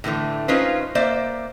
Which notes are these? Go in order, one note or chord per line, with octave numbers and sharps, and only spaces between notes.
A2 D3 E3 A3
C#4 D#4 F4 B4 C5
A#3 C5 D5 E5